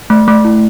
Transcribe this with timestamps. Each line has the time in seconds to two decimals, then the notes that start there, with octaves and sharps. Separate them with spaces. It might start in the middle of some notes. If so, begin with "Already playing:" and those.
0.10 A3
0.28 A3
0.45 E4